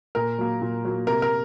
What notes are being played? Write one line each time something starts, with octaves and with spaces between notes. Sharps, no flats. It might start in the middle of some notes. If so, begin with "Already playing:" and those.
A#2 A#4
F#3 A#3
A#2
F#3 A#3
C3 A#4
A#4